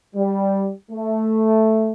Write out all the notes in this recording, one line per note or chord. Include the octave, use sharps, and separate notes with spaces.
G3
A3